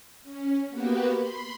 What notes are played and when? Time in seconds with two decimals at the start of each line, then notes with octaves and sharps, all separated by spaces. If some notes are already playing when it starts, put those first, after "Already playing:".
0.23 C#4
0.69 A#3 B3 F#4 G4 B4
1.14 B5 C6